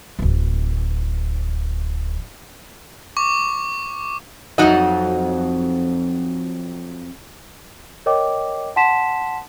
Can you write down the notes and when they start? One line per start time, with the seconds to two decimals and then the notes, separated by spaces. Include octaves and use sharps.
0.19 D1 E3
3.17 C#6 D6
4.58 F2 F#3 D#4 F#4 D#5
8.06 A#4 C#5 D#5 G5 D6
8.76 F#5 A5 C6 B6 E7